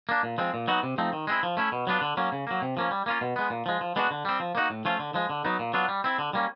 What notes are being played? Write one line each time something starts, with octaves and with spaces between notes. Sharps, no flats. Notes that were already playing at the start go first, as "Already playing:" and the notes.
A#3 D4
A#2
F3 G#3 C4
A#2
F#3 B3 D#4 F#4
C3
F3 A3 C4 D#4
D#3
G#3 C4 E4
F3
A3 C#4 E4
B2
F#3 B3 D4 F4
D3
F#3 A#3 C#4
C#3
F#3 A#3
C3
F3 A#3 C#4
G3
A#3 C#4 F4
B2
G#3 B3
A#2
F3 G#3
F3
G#3 B3 D4 F#4
D3
G3 C4
F3
A#3 D#4 F#4
A2
F3 A3 C#4 F4
D3
F3 G#3
D3
F#3 B3 D#4
A#2
F#3 B3 D4 F4
G3
C4 E4
D3
G3 A#3 C#4